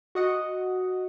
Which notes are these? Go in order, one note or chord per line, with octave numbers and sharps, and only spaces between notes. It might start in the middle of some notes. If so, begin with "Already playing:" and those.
F#4 D#5 F#5